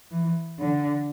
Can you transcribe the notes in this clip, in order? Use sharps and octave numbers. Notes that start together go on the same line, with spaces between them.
E3
D3